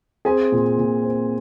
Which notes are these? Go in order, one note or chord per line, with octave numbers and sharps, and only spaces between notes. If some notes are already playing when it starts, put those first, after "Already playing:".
C4 G#4 G#5
A#2
A#2
C4